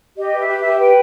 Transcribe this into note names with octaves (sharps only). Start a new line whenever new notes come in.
G4 D#5
B4
E5
G4
G4 E5
B4 G5